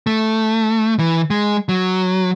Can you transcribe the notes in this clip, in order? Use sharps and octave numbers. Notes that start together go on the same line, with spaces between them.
A3
E3
G#3
F#3